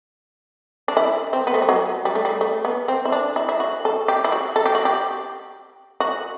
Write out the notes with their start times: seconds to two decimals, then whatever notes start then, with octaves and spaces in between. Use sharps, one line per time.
0.88 D4
0.97 E4
1.33 C4
1.47 B3
1.54 A3
1.62 G3
1.69 F#3
2.05 G3
2.15 A3
2.25 G3
2.41 A3
2.65 B3
2.88 C4
3.05 E4
3.12 D4
3.36 E4
3.49 E4
3.60 F#4
3.85 A4
4.08 G4
4.24 E4
4.32 F#4
4.56 A4
4.66 G4
4.75 F#4
4.85 G4
6.00 F#4